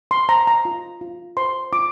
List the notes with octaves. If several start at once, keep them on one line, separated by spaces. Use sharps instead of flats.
C6
C5 A#5
A#5
F4
F4
C5 C6
F4 D6